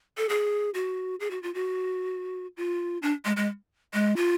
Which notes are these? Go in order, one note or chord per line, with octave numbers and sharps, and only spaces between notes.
A4
G#4
F#4
G#4
F#4
F4
F#4
F4
D4
G#3
G#3
G#3
F4